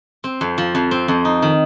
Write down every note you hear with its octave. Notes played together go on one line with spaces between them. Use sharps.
C4
F2
F3
F2
C4
F2
D#4
D#3